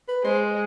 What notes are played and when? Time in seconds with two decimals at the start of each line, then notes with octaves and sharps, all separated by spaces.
0.08 B4
0.24 G#3 C5